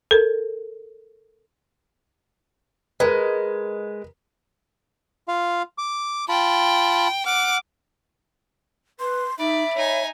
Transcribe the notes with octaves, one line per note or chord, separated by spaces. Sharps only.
A4 A#4
G#3 A#4 B4
F4 F5
D6
F4 G5 A5 B5
F#5 D6 F6
B4 C6
D#4 D5 E5 B5
D#4 C#5 G#5